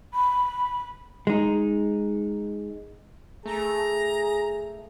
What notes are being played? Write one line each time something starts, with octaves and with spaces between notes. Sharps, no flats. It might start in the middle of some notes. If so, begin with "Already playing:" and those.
B5
G#3 D#4
A3 G#4 A#5